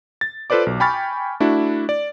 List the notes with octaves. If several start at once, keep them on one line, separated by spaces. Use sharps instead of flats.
A6
F4 A4 B4 C5 D5 D6
B1
G5 G#5 B5 C#6 F6 A6
A3 D4 E4 F#4
D5